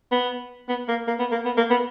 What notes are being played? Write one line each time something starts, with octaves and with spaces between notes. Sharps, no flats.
B3
B3
A#3
A#3
B3
A#3
B3
A#3
B3